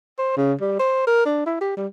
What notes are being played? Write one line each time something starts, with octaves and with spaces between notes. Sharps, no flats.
C5
C#3
G3
C5
A#4
D4
E4
G4
G3